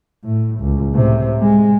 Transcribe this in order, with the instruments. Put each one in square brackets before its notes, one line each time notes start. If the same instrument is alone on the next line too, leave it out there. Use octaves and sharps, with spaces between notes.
[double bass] A2
C#2
A2 C3
G#3